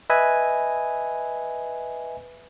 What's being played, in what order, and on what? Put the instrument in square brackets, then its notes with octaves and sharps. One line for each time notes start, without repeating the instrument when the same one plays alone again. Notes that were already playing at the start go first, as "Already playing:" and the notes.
[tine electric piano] B4 D#5 E5 G#5